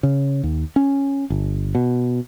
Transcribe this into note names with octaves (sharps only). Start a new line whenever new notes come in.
C#3
D#2
C#4
G1
B2